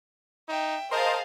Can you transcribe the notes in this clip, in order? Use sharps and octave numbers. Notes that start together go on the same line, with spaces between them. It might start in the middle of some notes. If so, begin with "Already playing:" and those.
D#4 E5 G5
G#4 A#4 C5 D#5 F5 A5